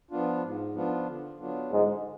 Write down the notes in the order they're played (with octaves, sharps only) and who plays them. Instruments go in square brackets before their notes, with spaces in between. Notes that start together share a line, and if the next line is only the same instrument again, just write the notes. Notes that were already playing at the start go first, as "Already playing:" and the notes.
[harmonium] F3 B3 D4 F4
G#2
F3 B3 D4 F4
D3
F#3 B3 D4 F4
[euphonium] G#2 [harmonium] D3